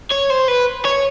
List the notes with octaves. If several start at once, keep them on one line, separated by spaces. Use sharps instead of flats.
C#5
C5
B4
C#5